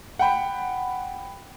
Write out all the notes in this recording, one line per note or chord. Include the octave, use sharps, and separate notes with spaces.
F#5 G5 B5